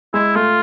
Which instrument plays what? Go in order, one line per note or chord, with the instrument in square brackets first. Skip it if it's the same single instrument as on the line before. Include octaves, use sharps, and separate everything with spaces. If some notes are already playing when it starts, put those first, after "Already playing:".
[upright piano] G#3 [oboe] E4
[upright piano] A3 [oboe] F4